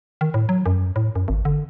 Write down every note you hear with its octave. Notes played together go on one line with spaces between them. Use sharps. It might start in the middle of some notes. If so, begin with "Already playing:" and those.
D#3
A2
F#3
F#2
A2
F#2
G#1
D3